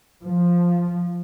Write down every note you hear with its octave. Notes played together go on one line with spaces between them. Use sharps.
F3